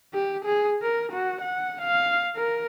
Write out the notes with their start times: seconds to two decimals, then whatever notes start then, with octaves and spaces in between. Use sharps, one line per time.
0.13 G4
0.45 G#4
0.82 A#4
1.12 F#4
1.41 F#5
1.81 F5
2.36 A#4